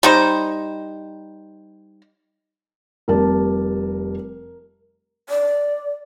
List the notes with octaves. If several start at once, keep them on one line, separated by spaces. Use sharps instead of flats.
G3 D#4 C5
F1 G3 A#4 A5
D5